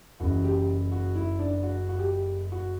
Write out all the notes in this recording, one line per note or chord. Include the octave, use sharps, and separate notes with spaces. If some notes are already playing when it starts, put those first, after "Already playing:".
F#1 F#2 C#3 E3 F#4
G4
F#4
E4
D4
F#4
F#4
G4
F#4